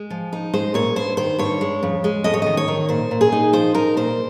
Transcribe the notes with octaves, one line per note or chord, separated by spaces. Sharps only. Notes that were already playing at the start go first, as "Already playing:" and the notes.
Already playing: G#3
F3
D#4
G#3 C5
A#2 C#5
G2 C5
D#3 C5
G2 C#5
G#3
F2
G#3
F2 D#5
C#5
D#3 D#5
C#5
D#3
A#2 C5
A#2
G#4
D#4
F3 C5
D#4 A#4
A#2 C5